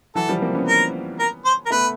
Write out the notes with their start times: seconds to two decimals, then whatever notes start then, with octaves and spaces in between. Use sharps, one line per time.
0.15 E3 F#3 A4
0.29 F3 G3
0.42 A#3 C4
0.54 B3 C#4
0.68 A#4
1.19 A#4
1.45 C5
1.66 A#4
1.70 A3 B3 B4